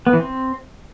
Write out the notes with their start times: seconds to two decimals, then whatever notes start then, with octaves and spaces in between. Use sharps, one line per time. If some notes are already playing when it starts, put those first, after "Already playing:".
0.07 B3
0.13 E3
0.20 C4